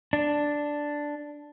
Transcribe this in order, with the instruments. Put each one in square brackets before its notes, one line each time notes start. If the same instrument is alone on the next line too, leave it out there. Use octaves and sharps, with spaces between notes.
[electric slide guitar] D4